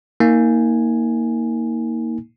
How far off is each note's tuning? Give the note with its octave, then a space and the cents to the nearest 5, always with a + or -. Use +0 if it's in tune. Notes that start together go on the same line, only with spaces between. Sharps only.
A#3 -5 D#4 +40 G#5 +0